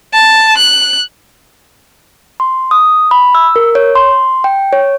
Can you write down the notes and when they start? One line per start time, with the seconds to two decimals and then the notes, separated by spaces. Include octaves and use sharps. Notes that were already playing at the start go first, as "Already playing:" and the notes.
0.13 A5
0.57 F#6
2.40 C6
2.71 D#6
3.11 B5
3.35 E6
3.56 A#4
3.75 C#5
3.95 C6
4.44 G5
4.73 C#5